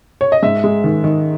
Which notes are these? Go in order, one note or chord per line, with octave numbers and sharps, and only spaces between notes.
C#5
D#5
G#2 E5
G#3
D#3
D#3